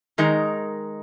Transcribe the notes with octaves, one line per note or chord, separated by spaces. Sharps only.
D#3 G#3 D#4 A#4